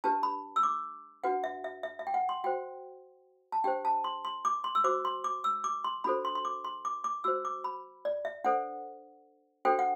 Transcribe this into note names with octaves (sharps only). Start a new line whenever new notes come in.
D4 G4 B4 A5
B5
E6
D6
D4 F#4 B4 F#5
E5
E5
E5
E5
G5
F#5
C6
F#4 C5 G5
A5
D4 G4 C5 G5
A5
C6
C6
D6
C6
E6
F#4 C5 D6
C6
D6
E6
D6
C6
D4 F#4 A4 C5 B5
C6
C6
D6
C6
D6
D6
F#4 C5 E6
D6
B5
D5
E5
D4 A4 C5 F#5
D4 F#4 A4 C5 G5
F#5